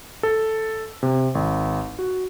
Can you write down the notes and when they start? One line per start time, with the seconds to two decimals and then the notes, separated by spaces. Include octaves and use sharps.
0.23 A4
1.03 C3
1.35 G#1
1.99 F#4